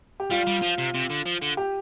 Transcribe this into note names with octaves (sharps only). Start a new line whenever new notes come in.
G4
G3 F4
G3
F3
C3
C3
D3
F3
D3
G4